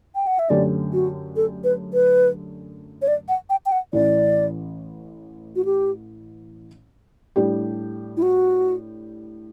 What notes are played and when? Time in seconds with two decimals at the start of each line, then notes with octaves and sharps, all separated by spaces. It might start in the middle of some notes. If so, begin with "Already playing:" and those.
0.15 G5
0.27 F#5
0.39 E5
0.50 F#2 D3 A3 C#4 G4 D5
0.93 F#4
1.36 A4
1.64 B4
1.94 B4
3.02 C#5
3.08 D5
3.29 F#5
3.50 G5
3.66 G5
3.72 F#5
3.93 A1 A2 E3 D5
5.56 F#4
5.65 G4
7.36 A2 G3 D4 G4
8.17 E4
8.22 F#4